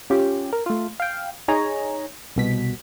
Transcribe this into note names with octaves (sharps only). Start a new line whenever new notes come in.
C#4 F4 G4
A#4
A3 F4
F5 G5
D#4 G#4 C#5 G#5 A#5
C2 B2 B6